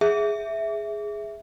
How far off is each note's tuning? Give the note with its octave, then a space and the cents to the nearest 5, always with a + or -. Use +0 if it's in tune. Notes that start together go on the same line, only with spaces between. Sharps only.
G#4 +0 E5 +0